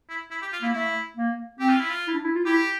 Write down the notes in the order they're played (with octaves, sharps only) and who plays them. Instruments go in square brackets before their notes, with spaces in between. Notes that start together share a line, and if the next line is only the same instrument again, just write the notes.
[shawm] E4
E4
G4
F4
[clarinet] A#3 [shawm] E4
[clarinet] A3 [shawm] E4
[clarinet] A#3
[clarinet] C4 [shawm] G4
[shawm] F4
E4
F4
[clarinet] E4
D4
E4
F4
[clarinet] E4 [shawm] G4